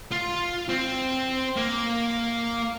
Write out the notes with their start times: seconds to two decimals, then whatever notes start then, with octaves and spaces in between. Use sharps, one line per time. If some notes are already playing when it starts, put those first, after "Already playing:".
0.11 F4
0.69 C4
1.56 A#3